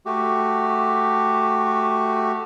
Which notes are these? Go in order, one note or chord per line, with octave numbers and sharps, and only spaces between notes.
A3 F#4 G4